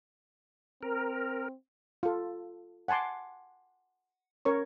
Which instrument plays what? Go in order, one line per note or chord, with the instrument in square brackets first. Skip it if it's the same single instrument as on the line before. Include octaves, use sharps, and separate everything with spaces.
[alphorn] C4 [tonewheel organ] A#4
[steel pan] F4 A4
F#5 G#5 A5 C6 D6
C#4 A#4 C#5 C#6